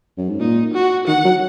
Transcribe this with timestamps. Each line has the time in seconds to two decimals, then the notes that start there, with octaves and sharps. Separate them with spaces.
0.17 F#2
0.29 G#2
0.40 A#2 D#4
0.74 F#4
1.08 D#3 F#5
1.25 F#3